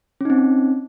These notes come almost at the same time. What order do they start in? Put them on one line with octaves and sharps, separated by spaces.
C#4 D#4 C4